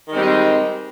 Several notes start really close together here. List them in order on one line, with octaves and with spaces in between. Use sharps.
D#3 G#3 C4 G3 D#4